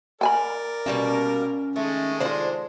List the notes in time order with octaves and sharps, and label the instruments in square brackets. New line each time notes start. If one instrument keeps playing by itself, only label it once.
[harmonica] A#4 D5 [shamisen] G5 G#5 B5
[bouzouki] B2 G3 A#3 [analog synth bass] C#4
[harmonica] D#3 G#3 [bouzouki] A3
[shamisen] F3 F4 [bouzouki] D4 C5